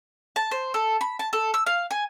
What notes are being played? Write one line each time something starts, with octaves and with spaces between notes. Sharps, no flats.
A5
C5
A4
B5
A5
A4
E6
F5
G#5